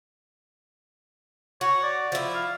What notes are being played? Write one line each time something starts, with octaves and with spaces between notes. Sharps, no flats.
F#4 C#5
D5
F3 E4
F5